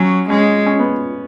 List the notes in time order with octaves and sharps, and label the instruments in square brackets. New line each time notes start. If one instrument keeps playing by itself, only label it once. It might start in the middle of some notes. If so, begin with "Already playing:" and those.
Already playing: [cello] F#3 [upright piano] C#4
[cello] G#3 [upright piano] C#4
[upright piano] C#4
B3